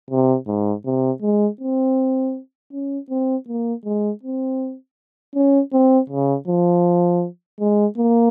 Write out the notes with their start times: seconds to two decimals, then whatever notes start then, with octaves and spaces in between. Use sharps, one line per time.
0.10 C3
0.47 G#2
0.85 C3
1.22 G#3
1.61 C4
2.72 C#4
3.10 C4
3.48 A#3
3.85 G#3
4.23 C4
5.35 C#4
5.73 C4
6.10 C#3
6.48 F3
7.60 G#3
7.98 A#3